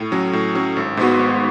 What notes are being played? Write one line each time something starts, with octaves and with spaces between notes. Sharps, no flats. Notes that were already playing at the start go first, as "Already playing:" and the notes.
Already playing: A2
F#3 C#4
A2
F#3 C#4
G#1
G#2 G#3 B3 F#4
G#1